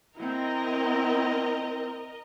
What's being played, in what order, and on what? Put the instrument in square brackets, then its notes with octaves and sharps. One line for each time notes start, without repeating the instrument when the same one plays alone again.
[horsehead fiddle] C4 E4 [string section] A#4 D#5